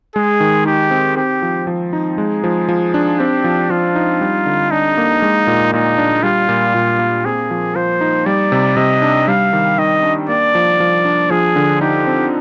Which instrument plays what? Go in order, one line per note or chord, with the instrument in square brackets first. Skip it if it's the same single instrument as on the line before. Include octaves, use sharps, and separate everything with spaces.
[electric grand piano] G#3 [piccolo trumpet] G#4
[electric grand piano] D#3
[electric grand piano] D#4 [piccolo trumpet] G4
[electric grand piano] C4
[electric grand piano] C4 [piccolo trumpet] G4
[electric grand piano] F3
F3
D#4
[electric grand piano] G#3 [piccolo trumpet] G#4
[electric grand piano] F3
F3
D4
[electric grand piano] C4 [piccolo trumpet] G4
[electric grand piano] F3
[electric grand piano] F3 [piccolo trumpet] F4
[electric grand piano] D#4
G3
D3
[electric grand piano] D4 [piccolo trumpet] D#4
[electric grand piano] A#3
G#3
A#2
[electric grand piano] A#2 [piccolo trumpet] D#4
[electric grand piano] D4
[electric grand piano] G3 [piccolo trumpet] F4
[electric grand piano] A#2
A#2
A#3
[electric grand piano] C4 [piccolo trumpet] G#4
[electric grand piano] F3
[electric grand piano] F3 [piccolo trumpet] C5
[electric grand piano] D#4
[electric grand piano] G3 [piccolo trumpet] D5
[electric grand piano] C3
[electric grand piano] C3 [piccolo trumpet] D#5
[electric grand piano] D4
[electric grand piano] G3 [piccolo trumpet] F5
[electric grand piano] D#3
[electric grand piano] D#3 [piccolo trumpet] D#5
[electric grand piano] D4
[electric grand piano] A#3 [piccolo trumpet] D5
[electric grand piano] F3
F3
D4
[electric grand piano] F3 [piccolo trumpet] G#4
[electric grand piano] D3
[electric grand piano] D#4 [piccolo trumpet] G4
[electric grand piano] C4